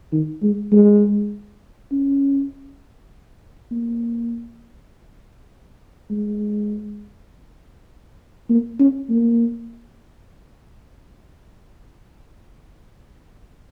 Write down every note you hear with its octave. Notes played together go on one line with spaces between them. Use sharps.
D#3
G#3
G#3
C#4
A#3
G#3
A#3
C#4
A#3